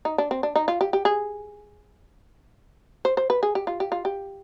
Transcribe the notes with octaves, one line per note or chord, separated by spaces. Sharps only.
D#4
D4
C4
D4
D#4
F4
G4
G4
G#4
C5
C5
B4
G#4
G4
F4
G4
F4
G4